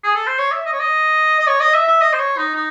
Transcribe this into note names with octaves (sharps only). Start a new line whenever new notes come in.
G#4
A4
C5
C#5
E5
D#5
C#5
D#5
D#5
C#5
D#5
E5
E5
D#5
C5
C#5
D#4
D#4